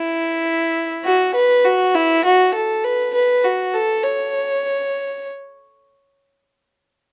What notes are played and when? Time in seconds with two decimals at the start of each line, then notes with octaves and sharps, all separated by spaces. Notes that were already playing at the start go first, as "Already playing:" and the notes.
Already playing: E4
1.05 F#4
1.35 B4
1.65 F#4
1.95 E4
2.24 F#4
2.54 A4
2.84 B4
3.14 B4
3.44 F#4
3.74 A4
4.04 C#5